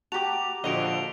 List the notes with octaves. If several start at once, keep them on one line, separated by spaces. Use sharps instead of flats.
F#4 G4 A5 A#5 D6 F7
A#1 D3 F3 F#4 D#5 D7 F7 G7